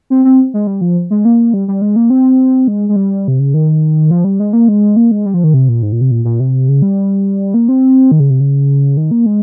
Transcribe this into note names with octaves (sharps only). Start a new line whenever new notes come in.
C4
C4
G#3
G3
F3
G#3
A#3
G3
G3
G#3
A#3
C4
G#3
G#3
G3
C3
C#3
D#3
F3
G3
G#3
A#3
G#3
A#3
G#3
G3
F3
D#3
C3
A#2
G#2
A#2
C3
A#2
A#2
C3
C#3
G3
A#3
C4
D#3
C#3
C3
C#3
D#3
A#3
G#3